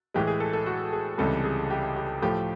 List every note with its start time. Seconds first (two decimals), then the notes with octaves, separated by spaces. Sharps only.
0.14 A2 E3 G#3 G4
0.27 G#4
0.40 A4
0.53 A4
0.66 F#4
0.93 G#4
1.18 C#2 C3 E3 G3 A4
1.44 G#4
1.70 G4
1.96 G4
2.22 A2 F3 A3 G4